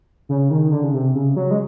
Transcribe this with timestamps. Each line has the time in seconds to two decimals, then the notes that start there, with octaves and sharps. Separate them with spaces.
0.29 C#3
0.50 D#3
0.71 D3
0.84 C#3
0.94 C3
1.15 C#3
1.36 F#3
1.51 G#3